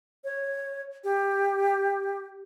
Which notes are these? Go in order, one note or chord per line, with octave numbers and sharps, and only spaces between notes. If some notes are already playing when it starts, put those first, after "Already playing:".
C#5
G4